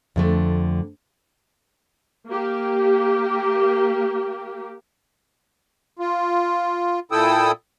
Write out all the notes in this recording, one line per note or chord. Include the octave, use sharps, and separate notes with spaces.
F2 D3 A3
A#3 G4
F4
A#2 E4 A4 G5 D#6 E6